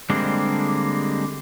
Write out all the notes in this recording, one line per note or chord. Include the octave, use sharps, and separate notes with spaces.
D3 G3 G#3 A#3 C4 D4